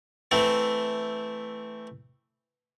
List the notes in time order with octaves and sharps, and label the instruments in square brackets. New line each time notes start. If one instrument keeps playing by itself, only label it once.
[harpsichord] E3 A3 C4